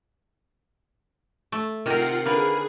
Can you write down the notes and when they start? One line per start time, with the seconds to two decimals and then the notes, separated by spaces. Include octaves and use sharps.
1.52 A3
1.86 C3 D#3 F4 A#4 F#5 C7
2.26 D3 G#4 A#4 B4 F5